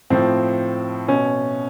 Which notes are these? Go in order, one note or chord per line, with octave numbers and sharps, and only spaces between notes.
A2 F3 C4
B2 C#4